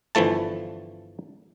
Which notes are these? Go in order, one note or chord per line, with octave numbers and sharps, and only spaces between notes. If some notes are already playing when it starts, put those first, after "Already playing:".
G1 E3 F3 A3 A5